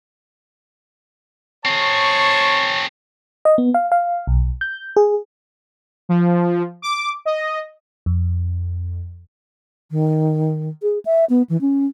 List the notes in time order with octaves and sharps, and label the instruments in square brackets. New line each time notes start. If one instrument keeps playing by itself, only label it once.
[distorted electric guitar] C4 G#4 [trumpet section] C#5 A5 C#6
[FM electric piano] D#5
B3
F5
F5
B1
G6
G#4
[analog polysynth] F3
D6
D#5
[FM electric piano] F2
[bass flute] D#3
G#4
E5
B3
E3
C#4